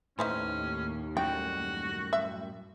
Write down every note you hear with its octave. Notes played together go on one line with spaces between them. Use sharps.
D#2 A2 C#4 D#4 B4 C5
F#2 A2 G3 F#4 G5
E5